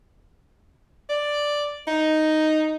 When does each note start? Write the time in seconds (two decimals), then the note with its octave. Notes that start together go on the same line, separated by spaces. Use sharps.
1.09 D5
1.87 D#4